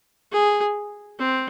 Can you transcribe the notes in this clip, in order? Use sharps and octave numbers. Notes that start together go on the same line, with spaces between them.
G#4
C4